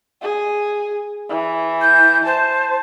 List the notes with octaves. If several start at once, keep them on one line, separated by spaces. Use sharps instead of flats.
G#4
E3
G6
C5 A5